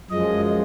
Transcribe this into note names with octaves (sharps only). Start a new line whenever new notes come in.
F#2 F3 G#3 D#5